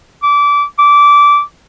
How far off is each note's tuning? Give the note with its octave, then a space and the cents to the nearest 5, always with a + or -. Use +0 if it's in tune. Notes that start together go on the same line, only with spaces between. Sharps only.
D6 -25
D6 -15